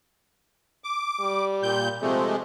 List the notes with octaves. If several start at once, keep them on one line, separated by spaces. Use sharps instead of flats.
D6
G3
A#2 G6
C3 F3 G#3 A3